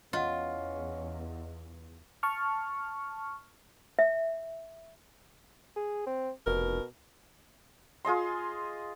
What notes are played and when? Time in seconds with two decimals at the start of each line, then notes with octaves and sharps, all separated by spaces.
0.13 E2 C#4 F4 D#5 F#5
2.23 A5 C#6 F6
3.99 E5
5.76 G#4
6.06 C4
6.46 F1 B2 A#4
8.05 F4 G#4 D#5 C6